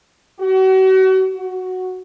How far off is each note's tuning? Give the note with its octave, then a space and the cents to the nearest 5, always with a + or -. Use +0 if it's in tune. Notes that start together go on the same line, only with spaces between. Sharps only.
F#4 +35
F#4 +0